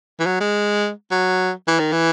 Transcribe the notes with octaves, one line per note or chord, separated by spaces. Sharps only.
E3
F#3
G#3
F#3
E3
D#3
E3